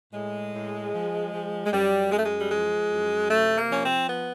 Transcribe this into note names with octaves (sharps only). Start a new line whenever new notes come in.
A2 G#3
A2
F3
F3
G#3
F#2 G3
F#2 G#3
A3
G#3
G3
F3 G#3
F#2
C3 A3
A#3
F3 C#4
C4
B3